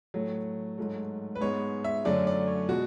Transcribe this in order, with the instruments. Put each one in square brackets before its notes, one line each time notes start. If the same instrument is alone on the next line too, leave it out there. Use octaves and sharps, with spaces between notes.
[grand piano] A2 F#3 A3
G#2 F#3 A3
B4
G#2 G#3 B3 C#5
E5
F#2 D3 F#3 A3 D5
D5
C#5
B2 G#3 F#4